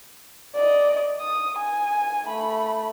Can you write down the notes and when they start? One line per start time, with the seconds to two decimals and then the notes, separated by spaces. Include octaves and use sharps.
0.55 D5 D#5
1.21 D#6
1.58 G#5
2.25 A3 B5